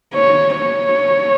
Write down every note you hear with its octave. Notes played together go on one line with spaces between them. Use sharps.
C#5
C#5